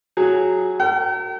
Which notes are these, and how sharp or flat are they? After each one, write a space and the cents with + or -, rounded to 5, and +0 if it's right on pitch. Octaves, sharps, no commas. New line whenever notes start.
F#3 +0 G#4 +0
A#4 -45 G5 -45